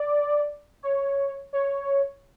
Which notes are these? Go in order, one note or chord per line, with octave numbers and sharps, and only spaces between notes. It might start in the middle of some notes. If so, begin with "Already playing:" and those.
Already playing: D5
C#5
C#5